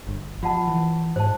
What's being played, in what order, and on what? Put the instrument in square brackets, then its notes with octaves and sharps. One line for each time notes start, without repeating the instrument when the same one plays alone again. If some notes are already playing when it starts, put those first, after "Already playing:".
[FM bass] G1
[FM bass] F3 [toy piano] F4 F#5 A5
[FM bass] E3
[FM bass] G#2 [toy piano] C5 A5